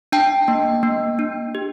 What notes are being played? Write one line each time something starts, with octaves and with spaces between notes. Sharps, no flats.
D4 G5 A5
A#3
A#3
D4
G4